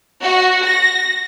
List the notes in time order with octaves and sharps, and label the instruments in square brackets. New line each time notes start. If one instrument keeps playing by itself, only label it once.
[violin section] F#4
A#6